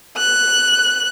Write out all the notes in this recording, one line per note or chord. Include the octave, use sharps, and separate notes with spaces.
F#6